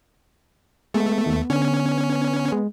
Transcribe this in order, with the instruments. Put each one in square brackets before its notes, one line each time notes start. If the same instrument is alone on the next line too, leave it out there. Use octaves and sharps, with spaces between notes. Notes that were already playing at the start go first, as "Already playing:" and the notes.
[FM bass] G#3 [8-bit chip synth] A3 [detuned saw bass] B3
[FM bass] D#2
[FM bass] D3 [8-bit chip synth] C#4
[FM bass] G#3